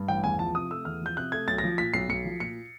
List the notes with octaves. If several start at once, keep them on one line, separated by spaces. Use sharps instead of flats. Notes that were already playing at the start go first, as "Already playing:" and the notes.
Already playing: G2
A1 G5
E2 G#5
F3 A5
C3 D#6
A3 E6
E2 F6
F3 G6
C3 F#6
A3 G#6
B1 A6
A#6
F3
A#2 B6
B1 C7
B1 C#7
F3
A#2 C#7